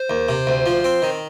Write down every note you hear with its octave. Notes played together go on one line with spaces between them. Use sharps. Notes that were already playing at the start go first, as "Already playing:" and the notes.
Already playing: C5
D#2
C3
D2
F3
C4
D#3